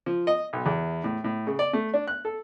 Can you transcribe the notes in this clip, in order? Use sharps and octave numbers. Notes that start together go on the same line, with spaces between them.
F3
D#5
B1
E2
A2
A2
C#3
D5
A3
D4
F#6
A4